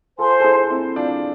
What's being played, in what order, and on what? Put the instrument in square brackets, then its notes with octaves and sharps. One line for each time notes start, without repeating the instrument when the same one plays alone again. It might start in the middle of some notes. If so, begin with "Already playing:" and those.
[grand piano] F4 A4 [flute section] C5 G#5 C6
[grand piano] A4
E4 G#4
C4 E4
D4 F4